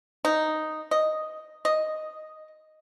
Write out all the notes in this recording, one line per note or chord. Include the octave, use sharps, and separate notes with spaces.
D#4
D#5
D#5